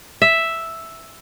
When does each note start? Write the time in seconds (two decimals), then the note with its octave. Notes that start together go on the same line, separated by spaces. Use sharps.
0.22 E5